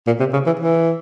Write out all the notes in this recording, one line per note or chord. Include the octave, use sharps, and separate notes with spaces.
A#2
C3
C#3
E3
E3